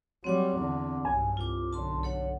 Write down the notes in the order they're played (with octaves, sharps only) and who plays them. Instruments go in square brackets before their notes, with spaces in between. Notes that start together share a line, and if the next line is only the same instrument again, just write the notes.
[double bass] F#3 G3 [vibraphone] C4 F#5 D6
[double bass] E2 D3
[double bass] B1 G2 [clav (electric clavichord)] G#5
[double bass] C2 [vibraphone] F4 D6
[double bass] B1 D3 [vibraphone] A5 C6
[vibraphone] A4 C#5 F#5